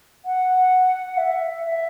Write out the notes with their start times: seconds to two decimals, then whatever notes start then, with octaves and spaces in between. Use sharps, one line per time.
0.25 F#5
1.17 E5
1.63 E5